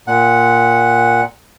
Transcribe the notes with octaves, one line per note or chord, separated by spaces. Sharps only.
A#2 F#5